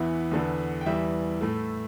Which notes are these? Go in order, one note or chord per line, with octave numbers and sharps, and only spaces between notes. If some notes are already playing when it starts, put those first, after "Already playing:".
Already playing: E2 E3 B3 E5
E2 D3 B3
G5
E2 E3 G3 E5
A2 A3